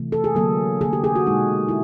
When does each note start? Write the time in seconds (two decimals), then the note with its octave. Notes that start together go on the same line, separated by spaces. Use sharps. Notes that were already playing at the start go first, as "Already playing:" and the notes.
Already playing: C3 E3 A3
0.12 A4
0.24 G#4
0.35 D3 F#3 A#3 A4
0.81 D3 F#3 A#3 G#4
0.93 G4
1.04 G#4
1.16 F#4
1.27 B2 G#3 D#4
1.69 E4